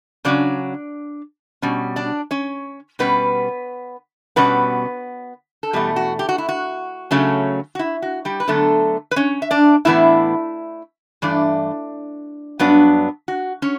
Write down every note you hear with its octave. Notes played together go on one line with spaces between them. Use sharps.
C#3 F#3 C#4 D4 D5
B2 G3 C#4
D4 D5
C#4 C#5
B2 G3 B3 C#4 B4
B2 G3 B3 C#4 B4
A4
E2 B2 G3 A3 G4
F#4
G4
F#4
E4
F#4
C#3 F#3 A3 C#4
F#4
E4
F#4
G3 G4
B4
D3 F#3 A3 B3 A4
B4
C#4 C#5
E5
D4 D5
A2 E3 B3 D4 E4 E5
G2 E3 A3 D4 D5
G2 F#3 B3 D4
F#4
C#4 C#5